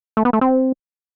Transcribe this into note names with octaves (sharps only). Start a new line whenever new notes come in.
A3
B3
A3
C4